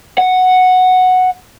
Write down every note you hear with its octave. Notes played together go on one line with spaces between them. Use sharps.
F#5